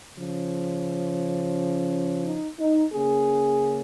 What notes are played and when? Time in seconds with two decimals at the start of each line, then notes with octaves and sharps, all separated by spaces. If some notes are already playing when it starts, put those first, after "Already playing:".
0.16 C#3 F3 C#4
2.24 D#4
2.59 D#4
2.93 C#3 A#3 C#4 G#4